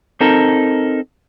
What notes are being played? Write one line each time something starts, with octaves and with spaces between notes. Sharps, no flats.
C4 D#4 A4 A#4